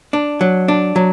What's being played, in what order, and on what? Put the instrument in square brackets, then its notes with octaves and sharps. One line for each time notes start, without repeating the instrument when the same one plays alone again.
[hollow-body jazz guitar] D4
F#3
D4
F#3